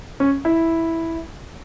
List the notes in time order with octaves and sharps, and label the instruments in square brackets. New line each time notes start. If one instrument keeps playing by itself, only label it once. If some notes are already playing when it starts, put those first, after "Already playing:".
[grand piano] C#4
E4